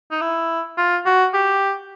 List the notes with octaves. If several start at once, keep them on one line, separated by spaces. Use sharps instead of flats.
D#4
E4
F4
F#4
G4